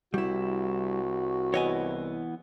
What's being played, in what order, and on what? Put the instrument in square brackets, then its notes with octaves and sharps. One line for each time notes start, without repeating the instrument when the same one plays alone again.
[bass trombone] C2 [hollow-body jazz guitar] G3 E4 [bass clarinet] F#4
[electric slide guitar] E3 B3 [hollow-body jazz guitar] C#5 D#5 G#5